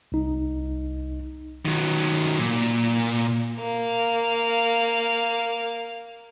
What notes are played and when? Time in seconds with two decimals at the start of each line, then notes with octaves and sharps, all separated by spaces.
0.12 C2 D#4
1.65 D#3 F#3
2.39 A#2
3.60 A#3 F5